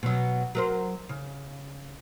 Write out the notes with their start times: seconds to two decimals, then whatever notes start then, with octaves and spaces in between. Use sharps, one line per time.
0.03 B2 F#3
0.55 F#3 A#4 C5
1.09 C#3